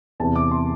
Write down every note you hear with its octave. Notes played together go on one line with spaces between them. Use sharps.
E2 C3 E3 A5
D6
C6